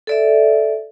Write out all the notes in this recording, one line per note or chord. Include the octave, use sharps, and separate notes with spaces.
A4 D5 E5